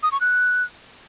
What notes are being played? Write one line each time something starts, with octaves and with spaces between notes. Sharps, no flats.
D#6
C#6
F#6